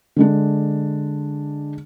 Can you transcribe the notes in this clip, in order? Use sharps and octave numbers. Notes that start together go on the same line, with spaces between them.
D3 G#3 D4